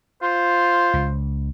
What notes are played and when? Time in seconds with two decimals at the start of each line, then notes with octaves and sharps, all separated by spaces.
0.22 F4 C5
0.94 C#2